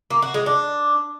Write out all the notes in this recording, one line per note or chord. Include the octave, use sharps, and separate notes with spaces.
A#3
F#4
G#3
D4